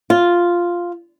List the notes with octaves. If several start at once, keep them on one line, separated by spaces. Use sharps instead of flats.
F4